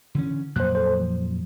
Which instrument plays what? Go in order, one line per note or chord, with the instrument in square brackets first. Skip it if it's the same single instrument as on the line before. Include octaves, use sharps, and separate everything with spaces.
[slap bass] D3 E3 C#4
[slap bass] F2 A#2 F#3 [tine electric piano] C5 F#6
[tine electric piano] A4 C5
F3